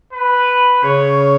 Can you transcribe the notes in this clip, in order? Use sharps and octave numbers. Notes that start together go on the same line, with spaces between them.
B4
C#3 C#5